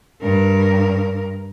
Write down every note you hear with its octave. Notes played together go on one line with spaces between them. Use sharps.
G2 A#4